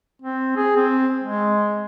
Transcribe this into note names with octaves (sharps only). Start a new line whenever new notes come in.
C4
G#4
C4
G#3